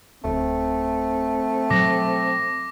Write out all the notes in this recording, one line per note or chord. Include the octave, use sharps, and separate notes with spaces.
D1 A3 C4
B2 F#3 D6 A#6